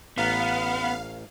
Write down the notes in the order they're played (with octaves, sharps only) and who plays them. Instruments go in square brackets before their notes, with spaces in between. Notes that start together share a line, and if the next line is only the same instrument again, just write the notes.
[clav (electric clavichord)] A1 A#5 [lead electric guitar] B3 [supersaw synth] F5